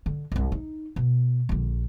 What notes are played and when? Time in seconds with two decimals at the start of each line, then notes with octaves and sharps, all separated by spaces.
0.06 D3
0.32 D1 C2
0.52 D#4
0.96 B2
1.49 A#1 D3